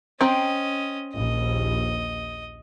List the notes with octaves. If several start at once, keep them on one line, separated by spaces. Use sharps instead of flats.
C4 C#4 D#5 G5 A#5
A#1 D#2 D#5